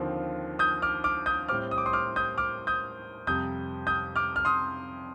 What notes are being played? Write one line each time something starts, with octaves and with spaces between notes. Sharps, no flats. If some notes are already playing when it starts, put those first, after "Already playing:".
Already playing: D#2 D3 F3 C4
D#6 G6
D6 F6
D6 F6
D#6 G6
A2 G3 C4 D6 F6
D#6
D6
C6 D#6
D6 F6
D#6 G6
D6 F6
D#6 G6
F2 C3 G3 D#6 G6
D#6 G6
D6 F6
F6
C6 D#6